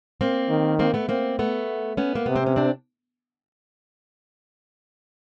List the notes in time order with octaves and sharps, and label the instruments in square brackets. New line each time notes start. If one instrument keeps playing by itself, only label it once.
[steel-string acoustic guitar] A#3 C4
[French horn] D#3
[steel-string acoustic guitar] A#3 C4
A3 B3
A#3 C4
A3 B3
B3 C#4
A#3
[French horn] C3 [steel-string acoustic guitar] B3
[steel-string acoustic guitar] C4
C#4
C4 D4